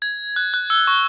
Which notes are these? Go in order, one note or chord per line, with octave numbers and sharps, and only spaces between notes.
G#6
F#6
F#6
E6
C#6